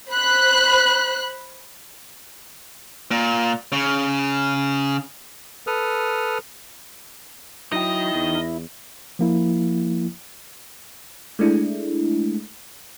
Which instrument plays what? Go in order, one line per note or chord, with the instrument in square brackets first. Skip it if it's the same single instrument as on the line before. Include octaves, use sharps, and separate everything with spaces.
[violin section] C5 B5 F#6
[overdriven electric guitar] A#2
C#3
[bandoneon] A4 B4 D#6 F6
[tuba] F#3 [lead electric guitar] D#4 G5 [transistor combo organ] E4 [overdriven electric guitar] D#5
[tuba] E2
[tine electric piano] F3 A#3 E4
[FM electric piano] G#3 A3 D4 E4